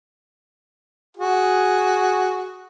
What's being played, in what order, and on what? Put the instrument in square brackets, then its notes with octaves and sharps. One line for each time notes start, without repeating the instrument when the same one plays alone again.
[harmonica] F#4 G#4